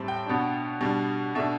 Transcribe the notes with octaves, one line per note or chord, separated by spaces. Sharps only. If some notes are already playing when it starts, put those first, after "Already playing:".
Already playing: A2 G3 C4 A5
G5
B2 B3 D4
B2 G3 D4
B2 A3 D4 E5